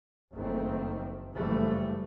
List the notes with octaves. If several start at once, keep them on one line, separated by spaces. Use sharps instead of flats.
F#1 F2 D#3 F3 A3 C4
F#1 G2 E3 F3 G3 A3